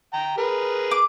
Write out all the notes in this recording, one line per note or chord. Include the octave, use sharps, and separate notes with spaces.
G5 A#5
G#4 A#4 B4
D6